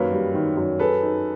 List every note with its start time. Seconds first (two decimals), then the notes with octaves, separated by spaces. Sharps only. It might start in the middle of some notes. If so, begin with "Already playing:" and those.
Already playing: F#2 D#3 A#3 B4 C#5
0.12 G3
0.34 D#3
0.57 F#2
0.79 G#4 A4 B4
1.02 D#4